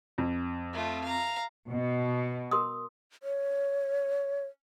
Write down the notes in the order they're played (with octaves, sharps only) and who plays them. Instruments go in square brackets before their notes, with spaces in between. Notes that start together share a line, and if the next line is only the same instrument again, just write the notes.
[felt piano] F2
[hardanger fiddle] A3 F4
F5 A#5
[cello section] B2
[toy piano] A#4 C6 D#6
[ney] C#5